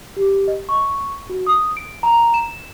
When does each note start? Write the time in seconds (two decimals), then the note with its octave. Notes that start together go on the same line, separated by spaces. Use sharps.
0.17 G4
0.48 D#5
0.69 C#6
1.30 F#4
1.47 D#6
1.77 D7
2.03 A#5
2.34 E7